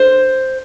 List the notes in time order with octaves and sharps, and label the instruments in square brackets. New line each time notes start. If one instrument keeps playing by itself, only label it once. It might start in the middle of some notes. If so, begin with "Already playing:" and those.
Already playing: [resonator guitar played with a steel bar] C5